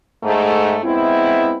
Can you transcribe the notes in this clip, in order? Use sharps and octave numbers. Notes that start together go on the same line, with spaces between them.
G#2 A3
G#3 B3 C4 E4